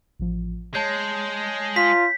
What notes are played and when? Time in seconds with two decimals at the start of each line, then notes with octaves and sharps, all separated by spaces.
0.19 A1 F3
0.75 G#3 C#5 A5 G6
1.76 F4 B6